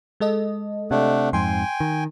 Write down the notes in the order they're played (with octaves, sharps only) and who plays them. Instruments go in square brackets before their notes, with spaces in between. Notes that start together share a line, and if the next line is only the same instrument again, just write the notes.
[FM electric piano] G#3 A4 D#5
[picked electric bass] C3 [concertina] A3 D4 F#5
[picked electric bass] F2 G#2 [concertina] G5 G#5 [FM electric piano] C6
[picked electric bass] D#3